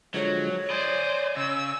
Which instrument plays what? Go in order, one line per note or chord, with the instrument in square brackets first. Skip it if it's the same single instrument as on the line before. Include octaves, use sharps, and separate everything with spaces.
[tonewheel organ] D3 F3 G#3 [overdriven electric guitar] F#3 [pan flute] C#5
[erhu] C5 [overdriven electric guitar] D5 D#5 [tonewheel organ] G#5
[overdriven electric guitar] C#3 [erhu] E6